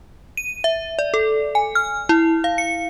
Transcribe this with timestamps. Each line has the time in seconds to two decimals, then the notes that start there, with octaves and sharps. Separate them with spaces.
0.37 D#7
0.64 E5
0.99 D5
1.14 A4
1.55 G#5
1.75 F6
2.09 E4
2.44 F5
2.58 C#7